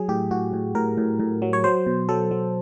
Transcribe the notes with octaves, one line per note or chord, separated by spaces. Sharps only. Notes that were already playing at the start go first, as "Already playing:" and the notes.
Already playing: F#3 G#4
A2 G4
A2 F#4
A2
A2 A#4
A2
A2
F#3
C#5
F#3 C5
B2
F#3 A4
F#3